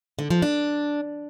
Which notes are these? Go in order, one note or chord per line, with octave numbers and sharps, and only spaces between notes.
D3
F3
D4